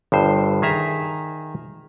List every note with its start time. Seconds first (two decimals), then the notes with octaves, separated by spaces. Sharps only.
0.12 G1 G2 C5
0.62 D#3 G#4 E5 A#5